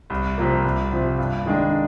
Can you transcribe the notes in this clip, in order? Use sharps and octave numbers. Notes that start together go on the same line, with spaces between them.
C2
C3 F3 A#3
C2
C3 F3
G2
D#3 G#3 D4